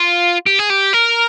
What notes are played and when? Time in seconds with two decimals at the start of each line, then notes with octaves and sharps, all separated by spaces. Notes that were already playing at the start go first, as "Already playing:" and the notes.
Already playing: F4
0.46 G4
0.59 G#4
0.70 G4
0.93 A#4